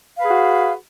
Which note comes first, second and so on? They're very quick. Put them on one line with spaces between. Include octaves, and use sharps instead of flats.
F5 B4 G#4 F#4